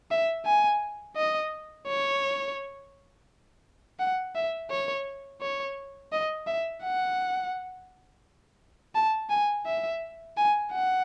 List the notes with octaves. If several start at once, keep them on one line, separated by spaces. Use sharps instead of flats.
E5
G#5
D#5
C#5
F#5
E5
C#5
C#5
D#5
E5
F#5
A5
G#5
E5
G#5
F#5